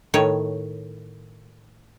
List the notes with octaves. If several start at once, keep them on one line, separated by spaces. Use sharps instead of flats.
A2 D#3 C#5